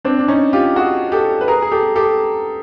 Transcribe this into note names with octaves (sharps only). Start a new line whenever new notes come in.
C4 D4
D4
C#4 D#4
F4 G4
F#4 G#4
G4 A4
B4
G#4 A#4
G#4
G4 A4
G4 A4